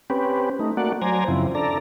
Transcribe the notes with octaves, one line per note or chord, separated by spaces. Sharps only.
C4 C#4 G4 B4
A3 D#4
A3 A#3 F#4 D5 F#5
F#3 C5 D5 G#5 A#5
F#2 C#3 F3 C4 E4
D4 A4 D5 A#5